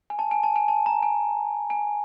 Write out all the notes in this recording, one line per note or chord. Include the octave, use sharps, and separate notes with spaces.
G#5
A5
G#5
A5
G#5
A5
A#5
G#5
G#5